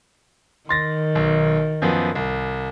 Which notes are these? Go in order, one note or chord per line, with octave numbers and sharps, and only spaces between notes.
D#3 C6 A6 A#6
B1
F#2 F3 B3
C2